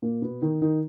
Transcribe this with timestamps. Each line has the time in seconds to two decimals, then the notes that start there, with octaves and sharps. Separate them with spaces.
0.02 A#2 A#3
0.22 B2 B3
0.42 D#3 D#4
0.62 D#3 D#4